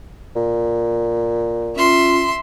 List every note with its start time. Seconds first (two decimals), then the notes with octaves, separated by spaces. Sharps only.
0.36 A#2
1.76 C#4 F4 E5 C6